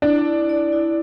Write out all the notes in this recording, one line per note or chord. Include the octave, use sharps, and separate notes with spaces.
D4 E4
E4
D5
E4